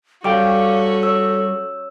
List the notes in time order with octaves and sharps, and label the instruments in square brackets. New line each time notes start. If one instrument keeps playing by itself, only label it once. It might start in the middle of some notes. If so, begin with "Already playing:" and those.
[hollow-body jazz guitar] G3 G5 [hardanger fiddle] C#4 F#4 [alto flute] A4 [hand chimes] F5 D6
[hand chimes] C#5 E6